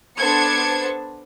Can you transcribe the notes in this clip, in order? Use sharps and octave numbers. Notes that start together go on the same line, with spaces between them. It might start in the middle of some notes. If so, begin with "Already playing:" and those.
B3 D4 A4 C5 G#6 C#7